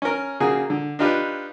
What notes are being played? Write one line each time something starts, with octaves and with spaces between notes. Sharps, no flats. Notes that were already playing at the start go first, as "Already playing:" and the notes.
C#4 A#4
C#3 A#3 F#4 G#4
D3
D4 D#4 F4 G4 B4